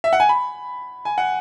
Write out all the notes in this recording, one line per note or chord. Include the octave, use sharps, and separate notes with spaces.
E5
F#5
G#5
B5
G#5
F#5